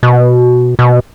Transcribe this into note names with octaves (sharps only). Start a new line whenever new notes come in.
B2
B2